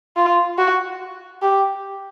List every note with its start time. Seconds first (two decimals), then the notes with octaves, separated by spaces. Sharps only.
0.17 F4
0.58 F#4
1.42 G4